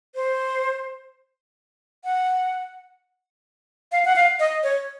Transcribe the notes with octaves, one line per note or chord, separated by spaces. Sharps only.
C5
F#5
F5
F#5
F5
D#5
C#5